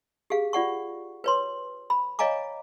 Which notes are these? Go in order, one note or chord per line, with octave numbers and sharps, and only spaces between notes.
G4 G#4 F5
F4 D5 F#5 C#6
B4 C#5 C6
B5
C#5 D#5 F5 G#5 A#5 D6